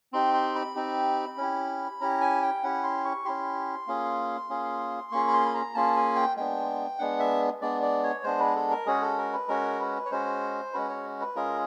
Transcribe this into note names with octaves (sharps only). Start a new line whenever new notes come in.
C4 D#4 G4 C6
C6
B5
C4 D#4 G4
C#4 E4 G4
C#4 E4 G4 A#5
G#5
G5
C#4 E4 G4 F#5
C6
C#6
C#4 E4 G4 C6
A#3 C#4 F4 G#4
A#3 C#4 F4 G#4
A#3 C#4 F4 G#4 C#6
B5
C6
B5
A#5
A#3 C#4 F4 G#4 A5
G#5
G5
G#3 B3 D4 G5
G#3 B3 D4 F#5
E5
G#3 B3 D4 D5
D5
C#5
G#3 B3 D4 C5
B4
A4
A#4
G#3 C#4 F#4 G#4
A4
A#4
B4
G#3 C#4 F#4 A#4
B4
C#5
G#3 C#4 F#4 C5
G#3 C#4 F#4 B4
C#5
B4
G#3 C#4 F4 G#4 A#4